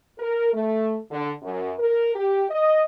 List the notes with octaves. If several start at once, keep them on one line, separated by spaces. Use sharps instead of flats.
A#4
A3
D3
F#2
A#4
G4
D#5